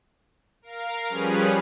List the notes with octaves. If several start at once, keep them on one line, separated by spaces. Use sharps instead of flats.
A#4 F5
F3 G3 C#4 G#4 B4